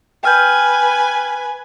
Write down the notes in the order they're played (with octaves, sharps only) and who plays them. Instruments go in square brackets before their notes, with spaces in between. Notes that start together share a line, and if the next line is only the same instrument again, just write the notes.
[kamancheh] B4 G#5 [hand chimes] G5 F6 G6